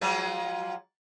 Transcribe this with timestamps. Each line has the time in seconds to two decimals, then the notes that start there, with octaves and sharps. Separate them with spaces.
0.01 F3 F#3 G#3